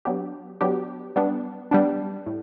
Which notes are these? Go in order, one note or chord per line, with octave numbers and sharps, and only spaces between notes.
F#3 B3 D4 G4
F#3 B3 D4 G4
G3 B3 D4
G3 B3 D4
A2